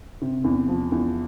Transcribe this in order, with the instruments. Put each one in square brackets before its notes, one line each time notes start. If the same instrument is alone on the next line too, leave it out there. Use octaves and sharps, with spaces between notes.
[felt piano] C3
E2
F3
E2